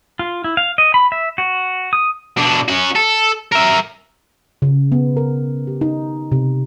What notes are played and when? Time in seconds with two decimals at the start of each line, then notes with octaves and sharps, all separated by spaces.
0.19 F4
0.44 E4
0.57 F5
0.78 D#5
0.94 B5
1.12 E5
1.38 F#4
1.93 D#6
2.37 B2 D4
2.68 C#4 F#4
2.96 A4
3.52 A#4 E5
4.62 C#3
4.92 B3
5.17 A#4
5.67 G4
5.81 D#4
6.32 C3